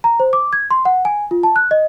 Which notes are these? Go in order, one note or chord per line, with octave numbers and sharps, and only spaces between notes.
A#5
C5
D6
G#6
C6
F#5
G#5
F4
A5
F#6
D#5